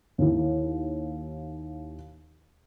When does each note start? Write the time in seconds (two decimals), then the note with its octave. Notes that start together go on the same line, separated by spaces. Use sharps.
0.18 D#2 E4